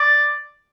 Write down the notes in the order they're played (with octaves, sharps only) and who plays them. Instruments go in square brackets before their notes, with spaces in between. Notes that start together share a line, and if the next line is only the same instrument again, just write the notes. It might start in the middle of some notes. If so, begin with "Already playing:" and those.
Already playing: [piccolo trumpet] D5